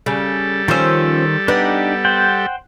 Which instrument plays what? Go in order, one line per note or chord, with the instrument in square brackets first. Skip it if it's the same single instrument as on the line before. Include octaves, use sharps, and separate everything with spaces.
[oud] C#3 [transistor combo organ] G3 A4
[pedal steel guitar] D#3 C5 E6 [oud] F3 C#4
[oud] B3 [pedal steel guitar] D4 D#4 G4
[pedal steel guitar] C5 F#5 G5